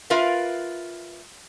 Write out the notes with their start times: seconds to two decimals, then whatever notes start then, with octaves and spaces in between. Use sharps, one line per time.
0.10 F4 A#4 B4 E5 F5